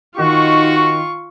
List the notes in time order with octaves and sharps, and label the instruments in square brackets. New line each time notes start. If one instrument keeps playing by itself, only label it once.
[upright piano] D#3 [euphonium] D#4 [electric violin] F4 C#6 [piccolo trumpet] F#4